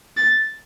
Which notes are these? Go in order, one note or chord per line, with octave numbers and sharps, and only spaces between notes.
A6